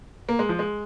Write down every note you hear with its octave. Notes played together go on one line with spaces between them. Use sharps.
A#3
G#3
F3
G#3